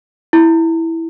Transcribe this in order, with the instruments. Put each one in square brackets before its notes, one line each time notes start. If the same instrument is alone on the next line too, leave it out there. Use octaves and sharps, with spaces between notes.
[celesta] E4